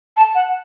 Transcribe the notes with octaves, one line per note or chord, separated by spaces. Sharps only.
A5
F#5